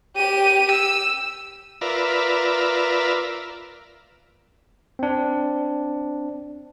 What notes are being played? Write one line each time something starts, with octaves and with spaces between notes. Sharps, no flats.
G4 D#7
E6
F4 A#4 B4 D5 E5
C4 D4